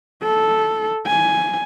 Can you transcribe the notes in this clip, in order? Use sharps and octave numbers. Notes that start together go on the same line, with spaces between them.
A4
G#5